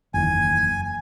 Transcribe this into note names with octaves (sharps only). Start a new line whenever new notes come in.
F#1 E2 D#3 G#5